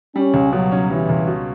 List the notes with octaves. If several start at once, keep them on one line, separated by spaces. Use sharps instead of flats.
G3 C#4
C#2
B2 F#3
C#4
E3 G3
C#2
B2